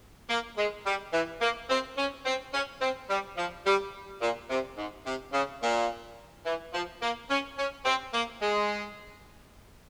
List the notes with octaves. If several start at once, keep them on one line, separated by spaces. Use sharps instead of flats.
A#3
G#3
G3
E3
A#3
C4
C#4
C4
C#4
C4
G3
F3
G3
A#2
C3
G#2
C3
C#3
A#2
E3
F3
A#3
C#4
C#4
C4
A#3
G#3